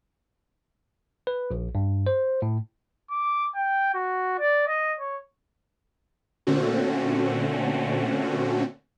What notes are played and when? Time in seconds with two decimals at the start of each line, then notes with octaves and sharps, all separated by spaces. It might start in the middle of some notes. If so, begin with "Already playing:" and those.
1.27 B4
1.51 A#1
1.75 G2
2.07 C5
2.42 A2
3.11 D6
3.56 G5
3.94 F#4
4.39 D5
4.67 D#5
5.00 C#5
6.47 A#2 D3 A3 C4 C#4 F#4